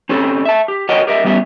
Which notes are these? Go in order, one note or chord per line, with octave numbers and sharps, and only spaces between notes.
C4 C#4 G4 A4
E5 A5
G4
F#4 A#4 C#5 D#5 F#5 G5
G4 A#4 D#5 E5
G3 B3 C#4 G4 E5